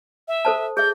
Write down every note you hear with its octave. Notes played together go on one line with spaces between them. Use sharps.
E5
A4 C5 A5
G#4 E5 G6